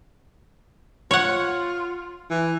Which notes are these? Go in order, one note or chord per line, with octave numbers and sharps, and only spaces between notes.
F4 C#5 F#5
E3